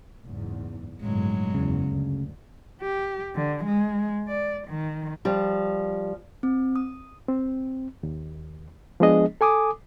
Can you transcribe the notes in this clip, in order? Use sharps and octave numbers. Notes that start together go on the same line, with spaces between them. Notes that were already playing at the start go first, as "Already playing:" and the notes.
F#1 E2 G#2
G1 A2 C#3 F#3 G#3
F#1 E2 C#3
D2
G4
D3
G#3
D5
D#3
F3 G3
C4
D#6
C4
D#2
F3 G#3 B3 D4 G#4 D#5
A4 G#5 D6 D#6